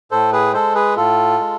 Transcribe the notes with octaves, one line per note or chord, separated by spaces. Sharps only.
A2 A4 C5
G#4 B4
G#3 A4 C5
G#4 B4
A2 F4 A4
G#3